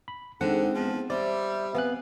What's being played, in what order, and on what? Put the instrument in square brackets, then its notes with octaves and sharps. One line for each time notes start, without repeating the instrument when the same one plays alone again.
[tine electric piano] B5
[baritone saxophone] D3 [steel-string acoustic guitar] G#3 C4 [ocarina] D#4 [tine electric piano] F#5
[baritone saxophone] F3 [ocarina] B3
[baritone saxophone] G3 [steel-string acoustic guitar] C5 [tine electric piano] D5 [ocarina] E5
[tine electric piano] B3 F#6 [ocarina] C4 [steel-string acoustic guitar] F5 G#5